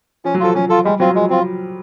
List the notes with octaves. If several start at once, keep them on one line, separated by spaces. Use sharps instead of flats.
F3 C#4
F#3
F3 F4 A4
F#3 C#4
F4 A4
G3 G#3
F#3 C4 F4
F3 G#3
C4 F4